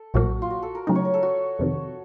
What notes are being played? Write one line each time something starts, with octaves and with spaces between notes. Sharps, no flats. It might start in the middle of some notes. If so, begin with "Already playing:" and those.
Already playing: A4
A#1 A#2 F#3 A#3 F#4
F4
F#4
A4
A#4
C#3 F#3 A3 D#4 A#4
C#5
A#4
A4
F#4
F2 C3 D#3